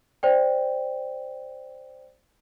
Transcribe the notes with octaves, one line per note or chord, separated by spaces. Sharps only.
C5 D5 G5